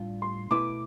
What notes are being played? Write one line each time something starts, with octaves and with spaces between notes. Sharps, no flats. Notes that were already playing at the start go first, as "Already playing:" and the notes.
Already playing: A2 G3 D4 F4
C6
B2 A3 E4 B4 D6